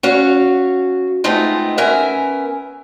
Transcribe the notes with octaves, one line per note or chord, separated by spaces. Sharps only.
C#4 F#4 F5
G#3 A3 B3 C4 D#4 F4
B3 C#4 A#4 E5 G#5